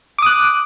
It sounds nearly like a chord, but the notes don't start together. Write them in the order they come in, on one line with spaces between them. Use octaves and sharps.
D6 D#6 F#6